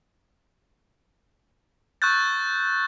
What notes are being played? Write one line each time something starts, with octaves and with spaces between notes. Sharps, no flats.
C#6 E6 F#6 G6 A6